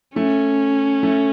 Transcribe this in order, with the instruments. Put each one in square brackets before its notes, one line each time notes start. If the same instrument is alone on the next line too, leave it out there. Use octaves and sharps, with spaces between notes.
[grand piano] A3 [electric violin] C#4
[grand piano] A3